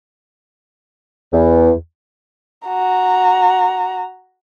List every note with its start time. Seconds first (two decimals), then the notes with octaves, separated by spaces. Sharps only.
1.32 E2
2.68 F#4 A#5